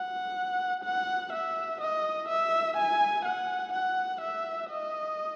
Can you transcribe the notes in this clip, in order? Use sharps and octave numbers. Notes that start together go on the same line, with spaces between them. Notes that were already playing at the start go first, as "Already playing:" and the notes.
Already playing: F#5
F#5
E5
D#5
E5
G#5
F#5
F#5
E5
D#5